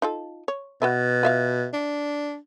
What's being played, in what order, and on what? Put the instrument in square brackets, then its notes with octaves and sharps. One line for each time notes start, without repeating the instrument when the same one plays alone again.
[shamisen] D#4 F4 A4
C#5
[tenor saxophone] B2 [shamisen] F#4 B4 E5
[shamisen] F4 E5 F5
[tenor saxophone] D4